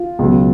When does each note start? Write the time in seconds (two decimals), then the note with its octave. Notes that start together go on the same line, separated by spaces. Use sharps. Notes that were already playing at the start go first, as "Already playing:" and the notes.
Already playing: F4
0.19 C#2 B2 F#3